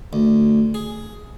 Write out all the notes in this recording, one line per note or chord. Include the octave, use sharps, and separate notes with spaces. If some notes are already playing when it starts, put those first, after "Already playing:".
D2
G#4